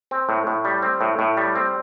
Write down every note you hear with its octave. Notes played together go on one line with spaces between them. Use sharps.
C4
A2
A2
G3
C4
A2
A2
G3
C4